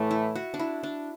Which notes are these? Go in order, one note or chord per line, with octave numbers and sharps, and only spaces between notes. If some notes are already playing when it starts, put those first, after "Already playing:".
Already playing: A2 E3 A3
E4
F#4
D4
E4
D4